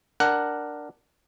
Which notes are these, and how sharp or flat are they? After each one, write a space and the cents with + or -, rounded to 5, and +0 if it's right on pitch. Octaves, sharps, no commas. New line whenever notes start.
D4 +5 A#4 +0 F#5 +10